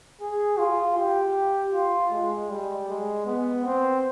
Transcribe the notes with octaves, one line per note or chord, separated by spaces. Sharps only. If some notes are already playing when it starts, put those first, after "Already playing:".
G#4
F4
G4
F4
G#3
G3
G#3
B3
C4